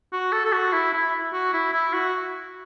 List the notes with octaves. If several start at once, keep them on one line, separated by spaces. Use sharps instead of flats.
F#4
A4
A4
F#4
E4
E4
F#4
E4
E4
F#4